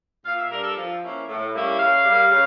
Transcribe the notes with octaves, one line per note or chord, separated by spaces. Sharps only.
A#2 F5
E5
G3 D4 A#4
A4
F3
A#3 C#4 E4
A2
G3 A#3 C#4 E4
C#3 F5
G3 A#3
C#3